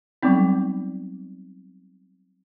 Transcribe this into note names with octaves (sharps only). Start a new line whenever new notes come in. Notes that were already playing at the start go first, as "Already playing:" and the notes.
F#3 G3 B3 C4 D#4